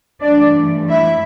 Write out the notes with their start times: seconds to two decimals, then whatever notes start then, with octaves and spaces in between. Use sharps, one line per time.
0.22 G2 E3 A3 D4 D5
0.88 E4 E5